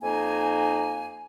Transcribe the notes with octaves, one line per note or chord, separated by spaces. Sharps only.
F2 A#3 D#4 G#5